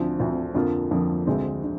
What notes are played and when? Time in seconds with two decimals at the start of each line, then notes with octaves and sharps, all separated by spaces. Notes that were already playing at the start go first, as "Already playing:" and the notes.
Already playing: D2 D3 F3 C4
0.19 D2 D3 F3 C4
0.55 F2 D3 F3 A#3 F4
0.91 F2 D3 F3 A#3 F4
1.27 D2 D3 G#3 C4
1.64 D3